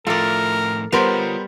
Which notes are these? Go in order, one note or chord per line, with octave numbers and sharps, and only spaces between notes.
A2 F3 F4 A4 A#4 D5 E5
G3 B3 F4 A#4 C5 C#5